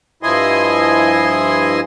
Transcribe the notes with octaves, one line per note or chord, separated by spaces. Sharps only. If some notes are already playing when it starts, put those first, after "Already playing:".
G2 F3 E4 D#5 G#5 C6